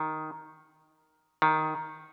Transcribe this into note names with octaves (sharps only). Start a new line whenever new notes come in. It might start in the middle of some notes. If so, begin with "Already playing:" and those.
Already playing: D#3
D#3